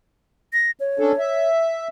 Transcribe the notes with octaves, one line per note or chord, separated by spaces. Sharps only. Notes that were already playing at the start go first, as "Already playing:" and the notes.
A#6
C#5
C#4 D4 A4
E5